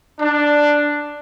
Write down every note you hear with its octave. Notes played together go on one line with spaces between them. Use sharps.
D4